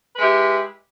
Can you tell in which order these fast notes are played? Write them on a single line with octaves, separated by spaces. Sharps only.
B4 G#3 E4 G4